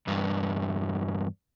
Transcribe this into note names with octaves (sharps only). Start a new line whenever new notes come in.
E2 G2